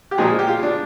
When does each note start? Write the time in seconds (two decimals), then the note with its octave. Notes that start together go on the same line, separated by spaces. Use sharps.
0.11 G4
0.18 A#2 F3 G#3 G#4
0.39 G4
0.48 F4
0.63 D4